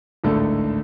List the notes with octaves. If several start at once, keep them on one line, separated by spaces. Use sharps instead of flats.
G#1 C#2 A2 D3 A3 A4